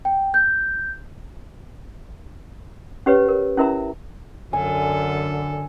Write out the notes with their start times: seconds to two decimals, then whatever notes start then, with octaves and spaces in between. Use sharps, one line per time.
0.05 G5
0.34 G6
3.06 C#4 G4 B4 C#5
3.29 A#4
3.58 C#4 E4 A#4 E5 A#5
4.53 F#2 D3 A4 G#5